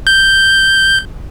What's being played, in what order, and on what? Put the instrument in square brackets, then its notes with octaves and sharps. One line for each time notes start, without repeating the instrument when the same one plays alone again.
[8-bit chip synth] G6